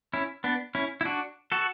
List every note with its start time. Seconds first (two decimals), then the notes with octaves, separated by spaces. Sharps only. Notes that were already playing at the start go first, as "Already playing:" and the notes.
0.13 C#4 E4
0.44 B3 D4
0.75 C#4 E4
1.01 E4
1.05 D4 F#4
1.52 F#4 A4